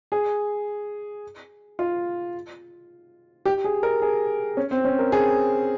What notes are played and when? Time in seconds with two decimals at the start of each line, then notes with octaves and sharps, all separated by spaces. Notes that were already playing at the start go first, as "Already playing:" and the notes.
0.12 G#4
1.79 F4
3.45 G4
3.64 G#4
3.83 A#4
4.02 G#4
4.57 C#4
4.71 C4
4.85 C#4
4.99 A#4
5.12 G#4